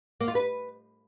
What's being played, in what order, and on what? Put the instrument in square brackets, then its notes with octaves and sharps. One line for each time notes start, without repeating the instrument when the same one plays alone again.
[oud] A#3
F4
B4